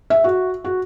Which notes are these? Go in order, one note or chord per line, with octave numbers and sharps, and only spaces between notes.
E5
F#4
F#4